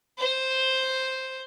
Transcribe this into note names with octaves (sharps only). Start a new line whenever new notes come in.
C5